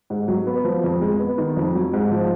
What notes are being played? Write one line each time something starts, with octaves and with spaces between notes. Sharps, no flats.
G#2
F#3
B3
F3
F2
G#3
B3
D#3
F2
F#3
G#2
F3